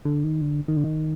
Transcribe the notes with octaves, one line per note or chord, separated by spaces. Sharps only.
D3
D#3
D3
D#3
D3
D#3